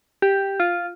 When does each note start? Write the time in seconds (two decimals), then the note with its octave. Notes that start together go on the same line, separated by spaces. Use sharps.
0.22 G4
0.60 F4